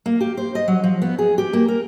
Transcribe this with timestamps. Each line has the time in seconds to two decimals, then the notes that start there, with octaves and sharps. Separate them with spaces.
0.06 A#3
0.20 G4
0.37 C5
0.55 D#5
0.68 F#3
0.84 F3
1.02 B3
1.18 G#4
1.38 G4
1.53 A#3
1.68 A#4